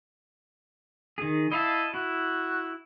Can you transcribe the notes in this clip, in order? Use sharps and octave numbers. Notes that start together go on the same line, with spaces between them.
D#3 G#4
E4 D#5 F5 A5
E4 F#4